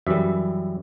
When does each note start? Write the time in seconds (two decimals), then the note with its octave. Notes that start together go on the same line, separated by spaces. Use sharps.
0.07 F#2 E3 G3 E5